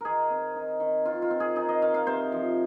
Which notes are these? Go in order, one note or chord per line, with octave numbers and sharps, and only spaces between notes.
D#3 G#4 A#4
C4
D#4
D#3
D#3 F4
F4
C4
G#4
D#4 G#4
D#5
D#3 F5
F5
C3 C5
F3